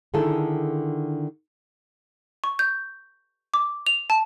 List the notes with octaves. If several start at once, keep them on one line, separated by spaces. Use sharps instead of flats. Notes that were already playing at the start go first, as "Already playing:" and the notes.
D3 D#3 E4 G#4 A4
C#6
G6
D6
F7
A5